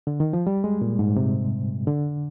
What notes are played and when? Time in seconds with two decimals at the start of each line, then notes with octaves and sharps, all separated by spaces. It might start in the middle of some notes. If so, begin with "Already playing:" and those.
0.07 D3
0.20 D#3
0.33 F3
0.47 G3
0.64 G#3
0.82 A#2
0.99 G#2
1.16 C3
1.87 D3